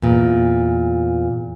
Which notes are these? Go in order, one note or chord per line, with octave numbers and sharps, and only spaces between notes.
E2 A#2